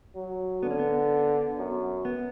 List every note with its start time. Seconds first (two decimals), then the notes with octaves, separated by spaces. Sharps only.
0.15 F#3
0.62 D3 B3
0.71 C#4
0.79 B3
1.58 F#2
2.05 B3